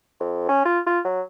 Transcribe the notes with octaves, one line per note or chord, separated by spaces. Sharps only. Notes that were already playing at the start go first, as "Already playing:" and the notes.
F2
C#4
F4
F4
F#3